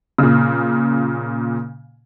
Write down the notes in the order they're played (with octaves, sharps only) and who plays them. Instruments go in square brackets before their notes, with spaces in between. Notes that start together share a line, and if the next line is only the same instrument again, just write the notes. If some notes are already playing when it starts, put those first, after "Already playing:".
[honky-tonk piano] A#2 C#3